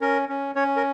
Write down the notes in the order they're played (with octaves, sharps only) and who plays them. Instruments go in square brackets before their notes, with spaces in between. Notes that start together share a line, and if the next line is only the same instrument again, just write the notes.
[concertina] C#4 A#4
C#4
C#4 C#5
A#4